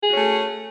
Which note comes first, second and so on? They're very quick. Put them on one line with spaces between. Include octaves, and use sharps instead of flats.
G#4 F#4 C#4 A3